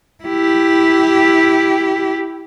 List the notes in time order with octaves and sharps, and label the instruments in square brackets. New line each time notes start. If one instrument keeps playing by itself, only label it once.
[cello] E4 G4